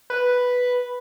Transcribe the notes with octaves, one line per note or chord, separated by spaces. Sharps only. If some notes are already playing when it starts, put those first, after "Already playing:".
B4